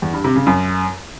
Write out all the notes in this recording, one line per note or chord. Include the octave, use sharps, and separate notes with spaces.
E2
G2
C3
C#3
F#2